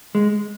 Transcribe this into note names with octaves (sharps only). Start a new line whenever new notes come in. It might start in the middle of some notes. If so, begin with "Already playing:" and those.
G#3